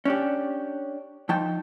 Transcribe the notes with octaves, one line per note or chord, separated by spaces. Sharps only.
C#4 D4 G4
F3 D#4 G5 A5